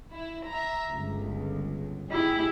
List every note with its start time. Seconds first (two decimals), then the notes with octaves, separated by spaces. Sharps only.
0.11 E4
0.47 E5 A#5
0.90 G1 C#2
2.12 E4 G4 G#4